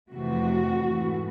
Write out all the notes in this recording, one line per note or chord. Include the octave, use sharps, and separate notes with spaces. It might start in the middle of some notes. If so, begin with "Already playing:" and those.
F2 C3 E3 A3 F#4
G#2 E3 A3